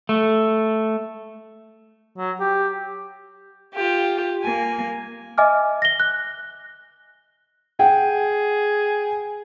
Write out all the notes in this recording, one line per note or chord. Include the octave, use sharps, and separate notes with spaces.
A3
F#3
G4
F4 G4
A#3 G#5
D#5 E5 G#5 D6 F6
A#6 G7
F#6
G#4 F#5 G5